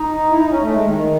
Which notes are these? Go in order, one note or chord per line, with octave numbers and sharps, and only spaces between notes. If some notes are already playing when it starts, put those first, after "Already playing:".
Already playing: D#4
E4
D#4
C#4
A3
G#3
D#3